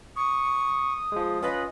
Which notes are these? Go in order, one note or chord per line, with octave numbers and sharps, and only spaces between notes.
C#6 D#6
F3 G#3
C#4 F4 B4 D#5